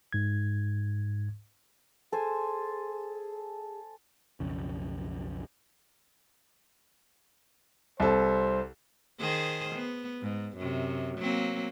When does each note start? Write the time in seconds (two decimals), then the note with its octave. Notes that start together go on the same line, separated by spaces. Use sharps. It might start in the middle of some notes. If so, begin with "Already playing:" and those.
0.13 G#2 G#6
2.12 G#4 A4 C5 G#5
4.40 B1 F2 C#3
8.00 C2 A4 C5
9.19 D#3 G#4 C5
9.75 B3
10.21 G#2
10.57 F#2 C3
11.18 F#3 A#3 C4